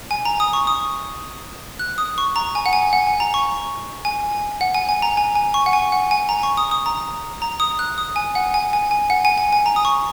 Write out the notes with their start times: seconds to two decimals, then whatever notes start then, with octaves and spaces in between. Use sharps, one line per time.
0.11 G#5
0.25 A#5
0.40 D#6
0.53 C#6
0.67 D#6
1.79 F#6
1.98 D#6
2.18 C#6
2.36 A#5
2.55 G#5
2.66 F#5
2.73 G#5
2.93 F#5
3.07 G#5
3.20 A#5
3.34 C#6
4.05 G#5
4.61 F#5
4.74 G#5
4.89 G#5
5.02 A#5
5.17 G#5
5.35 G#5
5.54 C#6
5.66 F#5
5.73 G#5
5.92 F#5
6.11 G#5
6.29 A#5
6.43 C#6
6.57 D#6
6.71 D#6
6.86 A#5
7.42 A#5
7.60 D#6
7.79 F#6
7.98 D#6
8.16 G#5
8.35 F#5
8.54 G#5
8.73 G#5
8.91 G#5
9.10 F#5
9.25 G#5
9.38 G#5
9.53 G#5
9.66 A#5
9.76 D#6
9.85 C#6